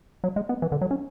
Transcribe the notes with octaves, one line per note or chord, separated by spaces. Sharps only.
F#3
G#3
B3
E3
D3
F#3
C#4